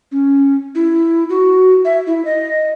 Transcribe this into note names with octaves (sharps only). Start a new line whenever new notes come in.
C#4
E4
F#4
E5
E4
D#5